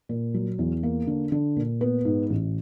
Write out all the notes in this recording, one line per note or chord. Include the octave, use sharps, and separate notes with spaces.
A#2
F#3
E2
A#3
D3
D3
A#2
B3
G#2
A1